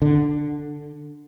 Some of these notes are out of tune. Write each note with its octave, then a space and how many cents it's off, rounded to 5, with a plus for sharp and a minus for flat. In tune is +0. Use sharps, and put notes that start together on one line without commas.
D3 +5